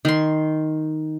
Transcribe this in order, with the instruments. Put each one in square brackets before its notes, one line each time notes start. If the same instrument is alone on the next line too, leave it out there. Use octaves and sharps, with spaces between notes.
[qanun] D#3 C6